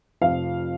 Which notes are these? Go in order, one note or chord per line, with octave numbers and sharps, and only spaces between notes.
F1 F2 F3 F5